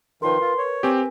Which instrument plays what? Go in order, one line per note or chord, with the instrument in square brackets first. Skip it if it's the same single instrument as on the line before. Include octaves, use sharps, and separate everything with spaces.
[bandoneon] D#3 F3 [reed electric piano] A#4 B4 [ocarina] C6
[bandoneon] F4
C#5
[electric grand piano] C4 G4 [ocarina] G#5